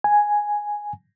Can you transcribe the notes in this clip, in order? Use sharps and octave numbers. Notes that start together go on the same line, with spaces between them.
G#5